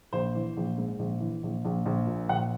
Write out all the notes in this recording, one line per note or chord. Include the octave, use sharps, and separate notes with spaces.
A#1 C5
E3
A#1
G#2
A#1
E3
A#1
A#1
A#1
A#2
A#1 F#5